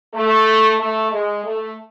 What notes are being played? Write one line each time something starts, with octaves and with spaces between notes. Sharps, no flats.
A3
A3
G#3
A3